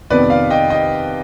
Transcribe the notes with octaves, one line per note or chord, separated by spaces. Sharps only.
F2 C3 D#3 B3 B4 D5
D5 F5
D#5 G5
D#5 G5